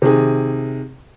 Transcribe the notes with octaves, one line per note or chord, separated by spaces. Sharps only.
C3 D#3 G#4